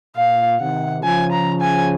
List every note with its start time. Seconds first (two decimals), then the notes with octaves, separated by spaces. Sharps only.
0.15 A#2 F5
0.59 C3 D#3 F#5
1.03 C#3 F3 G#5
1.32 A#5
1.61 G#5